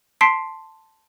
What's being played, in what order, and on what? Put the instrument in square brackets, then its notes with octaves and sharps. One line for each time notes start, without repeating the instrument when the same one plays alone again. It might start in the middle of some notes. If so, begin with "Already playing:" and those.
[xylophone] A5 C6 B6 C7 D7